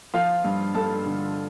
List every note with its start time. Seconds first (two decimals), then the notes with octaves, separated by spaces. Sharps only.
0.14 F3 F4 F5
0.44 G2
0.75 G2 A4 A5
1.06 D3